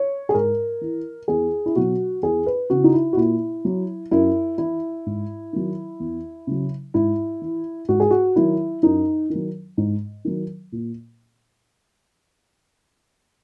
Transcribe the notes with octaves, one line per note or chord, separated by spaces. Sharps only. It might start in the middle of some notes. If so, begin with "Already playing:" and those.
Already playing: C#5
G#4
G#2 A#4
E3
E2 G#4
E4
B2 F#3 F#4
E2 G#4
B4
C#3 E3 F#4
D#4
E4
F#4
A#2 E4
F#3
F#2 E4
E3 E4
G#2
D#3 F#3
E2
C#3 F#3
G#2 E4
E3
G#2 F#4
G#4
F#4
D#3 F#3 E4
F#2 D#4
D#3
F#3
G#2
D#3 F#3
A#2